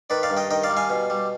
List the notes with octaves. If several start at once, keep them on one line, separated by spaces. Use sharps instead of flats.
D#3 B4 D5
D5 F5
G2
D#5 G5
D#3 D#5 G5
D5 F5
G3
F5 G#5
B2
G3